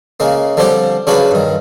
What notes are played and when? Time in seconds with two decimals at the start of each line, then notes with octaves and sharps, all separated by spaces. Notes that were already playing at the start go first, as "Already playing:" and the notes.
0.20 C#3 G#3 A#3
0.57 D3 F3 G3 C4 G4 C5
1.07 C#3 F#3 D4 F4 F#4 B4
1.31 G2 D#3